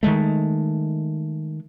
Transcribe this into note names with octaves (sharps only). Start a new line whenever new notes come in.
D#3 F3 G#3 A3